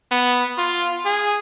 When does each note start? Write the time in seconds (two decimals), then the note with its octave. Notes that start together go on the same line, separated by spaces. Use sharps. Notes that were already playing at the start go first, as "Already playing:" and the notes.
0.11 B3
0.58 F4
1.05 G#4